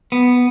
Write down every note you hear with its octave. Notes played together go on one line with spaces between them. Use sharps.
B3